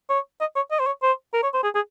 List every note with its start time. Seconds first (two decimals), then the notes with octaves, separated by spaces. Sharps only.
0.09 C#5
0.40 D#5
0.55 C#5
0.71 D#5
0.79 C5
0.86 C#5
1.02 C5
1.33 A#4
1.43 C#5
1.54 C5
1.63 G#4
1.75 G#4